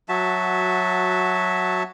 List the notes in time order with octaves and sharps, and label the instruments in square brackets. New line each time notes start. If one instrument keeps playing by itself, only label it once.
[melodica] F#3 F#4 E5 A5